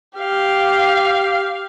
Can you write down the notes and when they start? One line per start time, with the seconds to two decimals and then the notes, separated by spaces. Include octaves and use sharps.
0.18 G4 F5